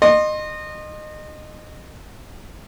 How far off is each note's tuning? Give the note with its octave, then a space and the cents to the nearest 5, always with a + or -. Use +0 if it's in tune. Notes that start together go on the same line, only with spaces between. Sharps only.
D#5 -25 C6 +20